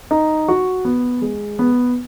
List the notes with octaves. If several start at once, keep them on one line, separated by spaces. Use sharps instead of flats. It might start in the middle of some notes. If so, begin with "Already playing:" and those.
D#4
F#4
B3
G#3
B3